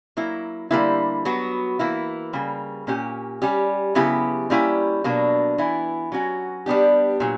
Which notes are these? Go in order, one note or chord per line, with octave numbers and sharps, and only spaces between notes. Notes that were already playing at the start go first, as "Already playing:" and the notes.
F#3 A#3 E4
D3 G3 A#3 E4
F#3 B3 F#4
E3 A#3 E4
C#3 G3 A#3
A#2 A#3 C#4 G4
G3 C#4 G4
C#3 F#3 B3 E4 G4
G3 A#3 C#4 E4 G4
B2 F#3 A#3 D4
E3 B3 E4
F#3 C#4 F#4
G3 B3 D4 G4
A#2 F#3